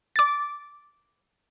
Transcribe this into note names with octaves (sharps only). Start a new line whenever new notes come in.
D6 A6